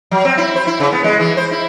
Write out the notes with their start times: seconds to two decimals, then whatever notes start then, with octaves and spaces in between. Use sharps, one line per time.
0.11 F#3
0.25 C4
0.37 E4
0.56 C5
0.67 E4
0.80 C#3
0.92 B3
1.04 G#3
1.20 E3
1.37 C5
1.51 E4